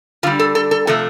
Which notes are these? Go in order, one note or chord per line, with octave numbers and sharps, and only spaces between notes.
D3 G3 F4
A4
A4
A4
C3 F3 A3 A4